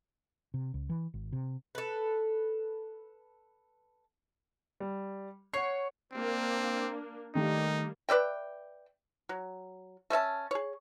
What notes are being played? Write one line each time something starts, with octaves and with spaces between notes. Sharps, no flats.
C3
C#2
E3
G#1
C3
A4 B4
G3
C#5 F#5 C7
A#3 C4 D4
D#3 G3 A3 A#3 D#4
B4 D5 E5 G5
F#3
A3 C#4 E5 A5
G#4 C#5